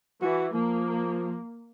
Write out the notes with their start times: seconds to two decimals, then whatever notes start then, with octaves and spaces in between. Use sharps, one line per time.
0.22 E3 F#4
0.54 F3 A#3